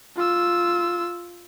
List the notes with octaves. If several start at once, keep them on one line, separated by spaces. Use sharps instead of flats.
F4 E6